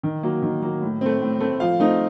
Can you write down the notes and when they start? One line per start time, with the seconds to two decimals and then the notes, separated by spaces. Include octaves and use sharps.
0.03 D#3
0.23 F#3 A#3
0.42 D#3
0.62 F#3 A#3
0.82 A2
1.01 A3 C4
1.21 A2
1.40 A3 C4
1.60 F3 F5
1.80 A3 C4 D#4